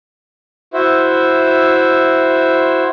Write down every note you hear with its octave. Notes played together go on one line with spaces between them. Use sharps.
E4 F#4 C5 E5